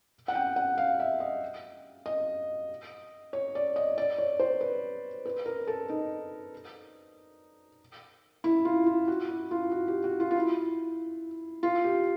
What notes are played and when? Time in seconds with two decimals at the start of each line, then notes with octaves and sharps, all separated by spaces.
0.28 F#5
0.35 G5
0.56 F#5
0.78 F5
1.00 E5
1.20 D#5
2.06 D#5
3.33 C#5
3.55 D5
3.76 D#5
3.98 D5
4.18 C#5
4.40 C5
4.61 B4
5.25 B4
5.46 A#4
5.67 A4
5.89 D#4
8.44 E4
8.65 F4
8.86 F4
9.08 F#4
9.29 E4
9.51 F4
9.72 F#4
9.88 G4
10.04 F#4
10.20 F4
10.31 F4
10.36 E4
11.63 F4
11.84 G4